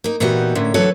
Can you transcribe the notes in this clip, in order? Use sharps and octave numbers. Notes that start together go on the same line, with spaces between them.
A#3 D#4
A#2 E3 B3 D#4 F#4 G4
A2 D3 A#3 C#4
D3 E3 F#3 A4 B4 C#5